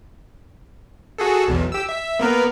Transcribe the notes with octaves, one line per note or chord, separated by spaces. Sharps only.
F#4 G#4 A4
B1 E2
G4 E6
E5
A#3 B3 A#4